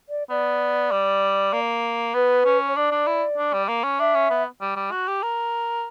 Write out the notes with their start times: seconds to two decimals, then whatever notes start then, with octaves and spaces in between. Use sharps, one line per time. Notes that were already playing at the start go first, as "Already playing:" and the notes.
0.09 D5
0.30 B3 D5
0.91 G3
1.53 A#3
2.14 B3 B4
2.45 C#4
2.68 C#5
2.76 D4 D5
2.91 D4
3.07 E4
3.38 D4
3.53 G3
3.69 A#3
3.84 C#4
4.00 D4 E5
4.15 C#4
4.30 B3
4.61 G3
4.76 G3
4.92 F#4
5.08 G4
5.23 A#4